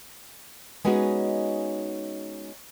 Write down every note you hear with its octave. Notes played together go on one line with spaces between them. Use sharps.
G#3 B3 C#4 D#4 F#4 G#4